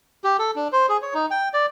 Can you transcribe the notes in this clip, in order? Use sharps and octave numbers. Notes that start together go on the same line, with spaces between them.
G4
A4
D4
C5
G#4
C#5
D#4
G5
D5